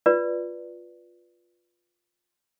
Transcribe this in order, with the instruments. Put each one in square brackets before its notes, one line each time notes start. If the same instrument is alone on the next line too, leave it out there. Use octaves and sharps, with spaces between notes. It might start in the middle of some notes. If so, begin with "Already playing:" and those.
[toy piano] F4 B4 D5